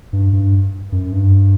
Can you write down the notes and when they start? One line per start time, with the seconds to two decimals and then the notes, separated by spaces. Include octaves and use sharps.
0.13 G2
0.33 G2
0.92 F#2
1.12 G2